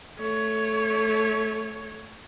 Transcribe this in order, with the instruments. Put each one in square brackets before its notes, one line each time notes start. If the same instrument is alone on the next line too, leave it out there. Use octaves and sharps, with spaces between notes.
[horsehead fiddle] A3 C#5